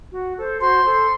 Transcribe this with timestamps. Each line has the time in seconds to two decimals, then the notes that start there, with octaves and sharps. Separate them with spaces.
0.12 F#4
0.37 A4 C5
0.60 F#4 C5 C6
0.85 A4 C5